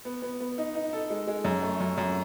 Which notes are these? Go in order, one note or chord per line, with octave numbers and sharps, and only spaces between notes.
B3
B3
B3
D#4
D#4
A4
G#3
G#3
F#2
A3
F#2
F#2